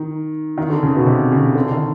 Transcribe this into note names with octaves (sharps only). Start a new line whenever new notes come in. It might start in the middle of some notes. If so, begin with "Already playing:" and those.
Already playing: D#3
D#3
D3
C#3
B2
C3
C#3
D3
D#3